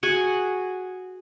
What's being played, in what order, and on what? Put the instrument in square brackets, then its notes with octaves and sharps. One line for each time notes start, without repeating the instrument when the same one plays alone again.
[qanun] F#4 G#4 F#5 G#5